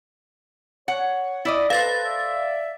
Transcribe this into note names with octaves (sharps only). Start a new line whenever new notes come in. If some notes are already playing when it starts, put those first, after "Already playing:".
C#5 F#5
E4 D5 D#5
A4 B4 C5 F5 A6
D5 E5